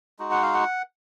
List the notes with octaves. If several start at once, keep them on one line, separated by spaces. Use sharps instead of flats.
G#3 D#4 F#4
F#5
F5
F#5